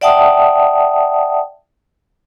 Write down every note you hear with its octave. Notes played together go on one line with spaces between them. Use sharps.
D5 E5 F#5 G5 A5 D#6